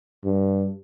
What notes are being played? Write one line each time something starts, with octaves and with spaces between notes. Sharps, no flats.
G2